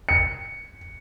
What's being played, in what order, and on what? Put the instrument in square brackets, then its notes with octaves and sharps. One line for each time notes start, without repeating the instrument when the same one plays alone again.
[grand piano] C#7